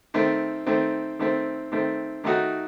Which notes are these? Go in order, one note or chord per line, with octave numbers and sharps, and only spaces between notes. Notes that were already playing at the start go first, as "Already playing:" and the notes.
D#3 A3 C4
D#3 A3 C4
D#3 A3 C4
D#3 A3 C4
D#3 A3 D#4 F#4